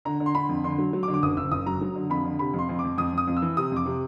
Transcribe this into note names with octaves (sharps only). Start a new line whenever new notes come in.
D3 A#5
D3
C6
D3 B5
F2
D3 C6
F#3
F#3
D6
D3
D6
F#1 D#6
F#1 E6
F#1 D#6
F#3 A#5
F#3
D3
F2 B5
D3
C3 B5
F2 C6
F2
D6
F2
F2 D#6
F2 D#6
F2
E6
E3
C3 D#6
F2 D6
C3